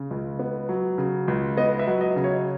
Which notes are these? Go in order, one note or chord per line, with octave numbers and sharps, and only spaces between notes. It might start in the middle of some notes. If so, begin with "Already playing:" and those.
Already playing: C#3
C#2
B3
F#3
C#3
C#2
B3 D#5
E5
F#3
D#5
C#3
C#5